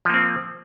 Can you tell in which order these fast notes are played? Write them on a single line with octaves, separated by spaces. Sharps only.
F3 A#3 C4